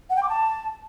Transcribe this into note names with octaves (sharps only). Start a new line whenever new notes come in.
F#5
G5
D6
A5